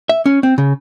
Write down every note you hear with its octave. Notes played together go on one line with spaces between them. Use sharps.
E5
C#4
C4
C#3